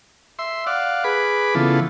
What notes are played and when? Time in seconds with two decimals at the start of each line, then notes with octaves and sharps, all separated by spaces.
0.39 E5 C6
0.67 D5 F5 F#5
1.04 G#4 B4 B5 D6
1.55 C#3 E3 B3 F4 A4